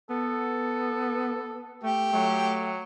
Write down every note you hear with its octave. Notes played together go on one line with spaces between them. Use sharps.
B3 A4
A3 G4
F#3 A3